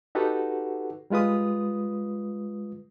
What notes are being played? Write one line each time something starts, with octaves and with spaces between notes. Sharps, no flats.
D#4 F#4 G4 A4 B4 F#5
G3 G#3 F4 B4 D#6